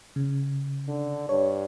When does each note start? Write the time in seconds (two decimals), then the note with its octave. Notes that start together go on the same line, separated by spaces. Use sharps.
0.16 C#3
0.88 D3
1.29 G2 C#5